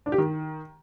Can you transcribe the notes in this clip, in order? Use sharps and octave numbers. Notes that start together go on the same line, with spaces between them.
D4
G4
D#3